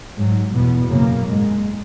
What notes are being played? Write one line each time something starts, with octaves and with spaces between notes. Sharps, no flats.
G#2 F#3
E2 B2 B3
F#2 C#3 A#3
G#2 G#3